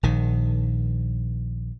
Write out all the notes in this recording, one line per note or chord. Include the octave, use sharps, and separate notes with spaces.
A#1 D#3